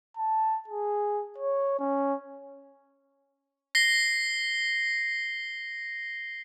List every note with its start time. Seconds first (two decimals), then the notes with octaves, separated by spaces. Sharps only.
0.17 A5
0.68 G#4
1.38 C#5
1.79 C#4
3.75 A#6 C7 G7